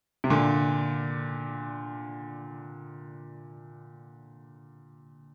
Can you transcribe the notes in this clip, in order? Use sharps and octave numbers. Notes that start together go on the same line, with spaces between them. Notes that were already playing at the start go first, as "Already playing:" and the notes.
C3
A#2 D3